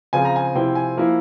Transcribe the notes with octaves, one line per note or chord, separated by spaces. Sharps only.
C#3 F3 C4 F4 G#5
A#5
G#5
C3 F3 C4 E4 G5
G#5
F3 A#3 E4